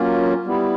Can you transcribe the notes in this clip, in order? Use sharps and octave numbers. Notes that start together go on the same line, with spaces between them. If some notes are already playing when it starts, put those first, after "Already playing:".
Already playing: F#3 A#3 C#4 F4
G3 B3 E4